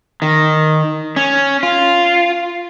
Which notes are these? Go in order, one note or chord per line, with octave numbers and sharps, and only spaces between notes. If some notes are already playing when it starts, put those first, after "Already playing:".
D#3
C#4
F4